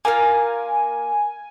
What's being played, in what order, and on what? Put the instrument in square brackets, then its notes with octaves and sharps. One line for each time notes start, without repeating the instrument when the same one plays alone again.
[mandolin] A#3 F4 A#4 F5 [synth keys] G#5